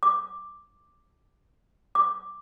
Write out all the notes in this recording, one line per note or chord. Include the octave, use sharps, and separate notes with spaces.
D6
D6